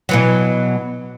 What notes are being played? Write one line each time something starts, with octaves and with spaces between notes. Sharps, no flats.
B2 E3 F#3